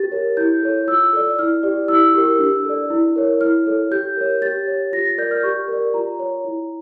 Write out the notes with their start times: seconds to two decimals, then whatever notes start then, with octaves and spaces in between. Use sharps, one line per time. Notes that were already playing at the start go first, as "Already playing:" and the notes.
Already playing: G4 A6
0.12 A#4 C#5
0.37 E4 G6
0.63 A4 C#5
0.87 F4 E6
1.13 A4 D5
1.39 E4 F6
1.63 G4 D5
1.88 E4 E6
2.14 G4 A#4
2.39 D4
2.65 A4 D5
2.90 E4
3.16 A#4 C#5
3.41 E4 F6
3.66 A4 C#5
3.91 G4 G6
4.17 A#4 C#5
4.42 G4 A6
4.67 C#5
4.93 F4 A#6
5.05 A6
5.18 A#4 D5 G6
5.31 F6
5.43 G4 C#6
5.68 A#4 D5
5.94 F4 A#5
6.19 C#5
6.45 E4